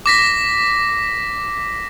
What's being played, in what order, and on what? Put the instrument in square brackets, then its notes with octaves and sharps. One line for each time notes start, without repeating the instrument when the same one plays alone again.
[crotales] D6 A#6 B6